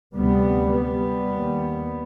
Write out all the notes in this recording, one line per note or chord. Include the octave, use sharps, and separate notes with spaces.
D2 C3 G3 B3
G3 B3
D#2